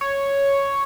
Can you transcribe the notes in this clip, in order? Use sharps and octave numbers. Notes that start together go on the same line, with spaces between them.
C#5